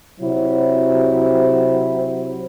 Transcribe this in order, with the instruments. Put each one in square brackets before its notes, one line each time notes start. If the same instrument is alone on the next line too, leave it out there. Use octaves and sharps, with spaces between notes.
[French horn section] C3 F#3 E4 C5